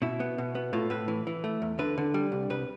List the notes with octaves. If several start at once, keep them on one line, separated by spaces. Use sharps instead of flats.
B2 E4
B3
B2
B3
A2 F4
A2 B4
E3
E3
A3
E2
D3 B4
D3
G3
C2
C2 B4